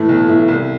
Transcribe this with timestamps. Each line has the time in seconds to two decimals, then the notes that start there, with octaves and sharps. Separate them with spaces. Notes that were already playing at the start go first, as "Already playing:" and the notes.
Already playing: A2 E3 A3
0.09 B1
0.28 A2 E3 A3
0.48 C2